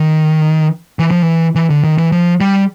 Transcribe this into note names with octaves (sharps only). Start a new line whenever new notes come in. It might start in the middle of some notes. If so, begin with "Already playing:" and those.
Already playing: D#3
E3
F3
E3
E3
D3
D#3
E3
F3
G3